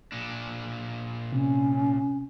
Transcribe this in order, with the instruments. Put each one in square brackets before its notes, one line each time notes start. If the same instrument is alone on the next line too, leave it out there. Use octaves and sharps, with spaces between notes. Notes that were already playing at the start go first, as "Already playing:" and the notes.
[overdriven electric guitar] A#2 D4
[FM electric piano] C3 [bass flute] C#4